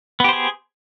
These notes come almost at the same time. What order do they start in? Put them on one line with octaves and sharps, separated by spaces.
B3 G4 C5 G#4